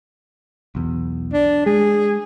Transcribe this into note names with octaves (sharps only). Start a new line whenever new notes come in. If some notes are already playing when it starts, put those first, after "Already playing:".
B1 E2
D4
G#3 G#4